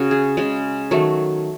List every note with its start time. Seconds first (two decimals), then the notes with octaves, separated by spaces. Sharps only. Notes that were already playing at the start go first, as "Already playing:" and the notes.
Already playing: C#3 F#4
0.11 G#4
0.37 C#3 G#3
0.91 D#3 F#3 A3